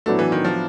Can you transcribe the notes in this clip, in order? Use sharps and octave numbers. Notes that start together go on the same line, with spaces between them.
A2 F#3 A3 B3 D4 F#4
E3
D#3
F3